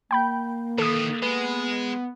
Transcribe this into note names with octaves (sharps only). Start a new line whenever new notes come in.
A#3 G5 B5 G6
D#3 E3 A4 D#6
G#3 B3